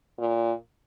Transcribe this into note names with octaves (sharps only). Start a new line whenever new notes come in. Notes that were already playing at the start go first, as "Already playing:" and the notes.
A#2